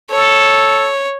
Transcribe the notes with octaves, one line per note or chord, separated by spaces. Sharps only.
A4 C#5